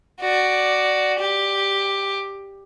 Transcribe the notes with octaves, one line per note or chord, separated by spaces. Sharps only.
F#4 D5
G4